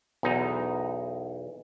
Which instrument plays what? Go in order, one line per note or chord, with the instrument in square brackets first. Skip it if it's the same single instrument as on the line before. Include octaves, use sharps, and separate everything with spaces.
[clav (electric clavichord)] B1 E2 D#4